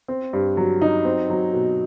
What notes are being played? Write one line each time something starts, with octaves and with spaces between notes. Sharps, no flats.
C4
G2
F#3
D#4
C4
F#3
B2